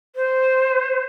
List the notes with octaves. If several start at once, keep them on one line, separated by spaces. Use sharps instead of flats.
C5